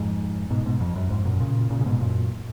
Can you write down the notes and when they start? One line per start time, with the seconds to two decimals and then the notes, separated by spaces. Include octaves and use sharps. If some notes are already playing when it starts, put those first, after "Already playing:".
Already playing: F2 G#2
0.50 G#2 B2
0.66 G#2 B2
0.80 F2
0.96 F#2
1.10 F2 G#2
1.25 F#2 A#2
1.40 A#2 C#3
1.70 A#2 C#3
1.81 C#3
1.85 G#2 B2
2.00 F#2 A#2